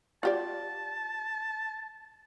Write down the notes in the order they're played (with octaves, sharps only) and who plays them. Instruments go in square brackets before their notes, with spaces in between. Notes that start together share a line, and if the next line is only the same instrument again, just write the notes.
[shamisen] F4 G4 D5 [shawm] A5